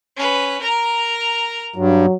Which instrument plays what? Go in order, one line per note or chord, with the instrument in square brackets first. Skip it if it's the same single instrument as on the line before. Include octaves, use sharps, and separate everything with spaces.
[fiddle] C#4 B4
A#4 A#5
[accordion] G2 [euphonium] F#3